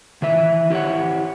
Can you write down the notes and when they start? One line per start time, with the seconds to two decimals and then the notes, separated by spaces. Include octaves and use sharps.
0.22 D#3 E3 E5
0.70 E4 G4 A4 C#5 F#5